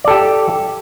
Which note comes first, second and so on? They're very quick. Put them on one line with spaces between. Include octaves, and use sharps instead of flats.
D5 A4 G4